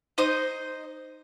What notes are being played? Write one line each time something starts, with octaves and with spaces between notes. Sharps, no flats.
D#4 C5 D#5 D#6